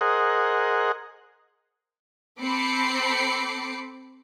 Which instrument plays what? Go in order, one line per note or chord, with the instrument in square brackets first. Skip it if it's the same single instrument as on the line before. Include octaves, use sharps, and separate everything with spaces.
[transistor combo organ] G#4 A#4 C5 D#5 F#5
[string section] C4 A4 B5 D6 C7 C#7